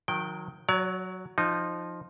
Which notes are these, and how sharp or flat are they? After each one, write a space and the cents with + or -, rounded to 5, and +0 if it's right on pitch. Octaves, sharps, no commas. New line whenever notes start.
D#3 +0 F#3 -35 G5 -5
F#3 +0 C#5 +45
F3 +0 D#4 -15